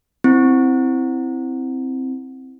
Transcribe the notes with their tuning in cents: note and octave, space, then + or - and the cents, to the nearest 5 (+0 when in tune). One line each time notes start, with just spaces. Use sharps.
C4 +0 E4 +0